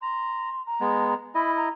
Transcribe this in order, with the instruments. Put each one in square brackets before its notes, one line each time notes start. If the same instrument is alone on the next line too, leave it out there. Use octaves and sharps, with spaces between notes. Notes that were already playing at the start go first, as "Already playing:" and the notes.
[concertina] A#5 [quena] C6
[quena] A#5
[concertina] G#3 B3
[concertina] E4 D#5 [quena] B5
[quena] A#5